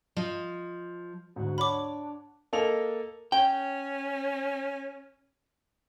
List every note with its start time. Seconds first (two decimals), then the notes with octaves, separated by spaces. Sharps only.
0.16 F3 D#5
1.36 D2 G#2 F#4
1.58 D4 C#5 F#5 B5 D6
2.53 A#3 A4 D#5 F7
3.32 C#4 G5